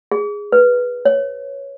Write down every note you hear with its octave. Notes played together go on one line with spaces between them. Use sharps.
G#4
B4
C#5